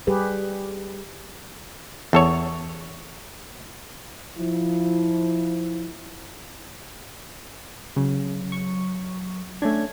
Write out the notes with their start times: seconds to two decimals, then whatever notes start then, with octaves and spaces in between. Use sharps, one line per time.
0.07 G3 G4 G#4 B4
2.13 E2 A4 C#5
4.37 F3 E4
7.96 C#3 F#3
8.52 C#6
9.62 A3 C#4 D4 G#6